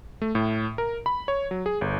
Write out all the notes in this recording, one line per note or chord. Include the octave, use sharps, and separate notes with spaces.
A3
A2
A#4
B5
C#5
F#3
G#4
G1